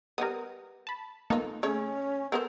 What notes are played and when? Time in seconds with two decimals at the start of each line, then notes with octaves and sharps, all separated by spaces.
0.18 G3 A#3 B3 A#4 D#6
0.87 A5 B5
1.30 A#3 B3 D#4 F4 A4
1.63 C#3 A3 C#4 C#5
2.32 B3 A4 A#4 C5